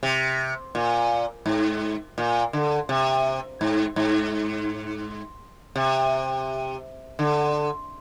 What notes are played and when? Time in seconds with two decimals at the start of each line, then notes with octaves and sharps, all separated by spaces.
0.03 C3
0.75 A#2
1.46 G#2
2.18 A#2
2.53 D3
2.89 C3
3.61 G#2
3.96 G#2
5.76 C3
7.19 D3